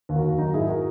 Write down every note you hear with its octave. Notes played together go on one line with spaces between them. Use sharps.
D#2
F#4 A#4
D#2
F#3 D#4 F#4
G#2 E4 G#4
F#4 A#4